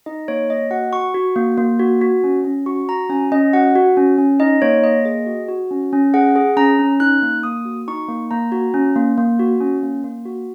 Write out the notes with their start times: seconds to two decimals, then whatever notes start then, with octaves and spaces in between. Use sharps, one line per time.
0.06 D#4 D#5
0.28 A#3 C#5
0.50 A#3 D#5
0.71 F#4 F#5
0.93 F#4 C#6
1.14 F#4
1.36 A#3
1.58 A#3
1.79 F#4
2.01 F#4
2.24 C#4
2.44 C#4
2.66 F#4 C#6
2.89 F#4 A#5
3.10 C#4 G#5
3.32 C#4 D#5
3.53 F#4 F#5
3.75 F#4
3.97 C#4
4.18 C#4
4.40 D#4 D#5
4.62 A#3 C#5
4.84 A#3 D#5
5.05 G#4 D#5
5.26 F#4
5.48 F#4
5.71 C#4
5.93 C#4
6.14 G#4 F#5
6.36 G#4
6.57 C#4 A#5
6.79 C#4
7.00 D#4 F#6
7.22 A#3
7.43 A#3 D#6
7.65 F#4
7.88 D#4 C#6
8.09 A#3
8.31 A#3 A#5
8.52 F#4
8.74 C#4
8.96 A#3
9.18 A#3
9.39 F#4
9.61 C#4
9.83 A#3
10.04 A#3
10.25 F#4